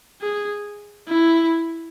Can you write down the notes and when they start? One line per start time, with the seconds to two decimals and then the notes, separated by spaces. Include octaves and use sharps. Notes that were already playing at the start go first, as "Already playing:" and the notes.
0.22 G#4
1.08 E4